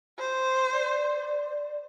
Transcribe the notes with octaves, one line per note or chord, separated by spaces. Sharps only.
C5
D5